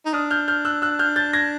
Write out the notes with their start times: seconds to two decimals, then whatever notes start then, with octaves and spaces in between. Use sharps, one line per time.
0.05 D#4
0.13 D4 D#6 F6
0.31 F6 G6
0.48 F6 G6
0.65 E6 F#6
0.82 E6 F#6
0.99 F6 G6
1.16 G6 A6
1.33 G#6 A#6